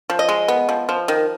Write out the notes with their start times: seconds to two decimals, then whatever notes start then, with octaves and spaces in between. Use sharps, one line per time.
0.10 F3
0.19 D#5
0.29 G#3
0.48 B3
0.69 F3
0.89 F3
1.08 D#3